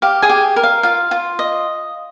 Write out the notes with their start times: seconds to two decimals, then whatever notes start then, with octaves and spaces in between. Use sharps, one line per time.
0.02 G4 F5
0.22 G#4 G#5
0.30 G4
0.56 A#4
0.63 F5
0.83 F4 F5
1.11 F4
1.39 D#5